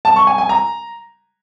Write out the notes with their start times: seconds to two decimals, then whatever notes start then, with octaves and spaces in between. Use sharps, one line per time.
0.05 A5
0.16 C#6
0.27 G#5
0.38 G#5
0.49 A#5